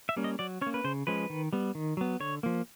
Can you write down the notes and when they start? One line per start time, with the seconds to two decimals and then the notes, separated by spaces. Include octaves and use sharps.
0.09 E5
0.17 G3 A#3 C#4
0.24 D#5
0.39 F#3 D5
0.61 C#4 C#5
0.66 A#3
0.74 B4
0.84 C#3 C5
1.07 F3 G#3 C#4 B4
1.30 D#3
1.53 G3 B3
1.75 D#3
1.97 F#3 B3
2.20 D3 C#5
2.43 F3 A#3